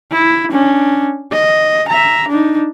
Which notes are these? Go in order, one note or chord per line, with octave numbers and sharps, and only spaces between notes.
E4
C#4 D4
D#5
E5 A#5
D4 D#4